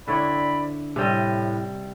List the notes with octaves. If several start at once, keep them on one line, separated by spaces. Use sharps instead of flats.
D3 C4 E4 C#5 D5 B5
A2 C3 G3 D#5